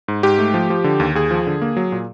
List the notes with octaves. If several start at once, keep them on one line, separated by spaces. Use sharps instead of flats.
G#2
G#2 G4
A3
F3
F3
D3
D#2
D#2 G#4
F3
D3
A#3
F#3
A#2